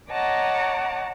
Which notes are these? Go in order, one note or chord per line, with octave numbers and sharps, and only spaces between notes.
C#5 D#5 F#5 A5 A#5 D6